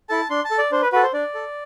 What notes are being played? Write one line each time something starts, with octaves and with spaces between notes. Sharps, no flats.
E4 A4 A5
D4 C6
A5
A4
D5
D4 C5
B4
F#4 A4 B4
C5
D4 D5
A4